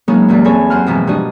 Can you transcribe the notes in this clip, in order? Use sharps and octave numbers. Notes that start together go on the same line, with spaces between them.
F#3 G#3 A#3 B3 C#4 D#4
E2 G2 A#2 E3
C4 E4 G#4 A4 C#5 G#5
F#2 F#5 C6 F6
F2 G#2 B2 E3
G2 D4 F#4 D#5